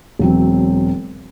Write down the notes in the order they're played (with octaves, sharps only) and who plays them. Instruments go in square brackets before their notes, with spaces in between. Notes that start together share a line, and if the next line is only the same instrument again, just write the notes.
[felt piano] E1 F#3 C4